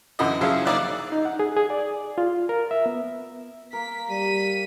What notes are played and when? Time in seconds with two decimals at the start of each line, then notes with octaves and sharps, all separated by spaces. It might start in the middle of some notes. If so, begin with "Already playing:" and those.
0.19 F#2 D3 E3 F#4 D#5
0.41 C#3 F3 F#3 E4 F4 G#4
0.65 A#3 D#4 D5 E5 F#6
1.12 D#4
1.25 F#5
1.39 G#4
1.57 G#4
1.70 D5
2.18 F4
2.49 A#4
2.71 E5
2.86 B3
3.73 A#3 A#4 B6
4.10 G3 B6 D#7